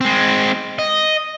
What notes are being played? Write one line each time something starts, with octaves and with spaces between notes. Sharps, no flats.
G#3 C4
D#5